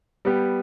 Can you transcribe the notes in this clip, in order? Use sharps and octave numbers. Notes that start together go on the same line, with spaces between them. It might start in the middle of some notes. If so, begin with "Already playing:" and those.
G3 B3 G4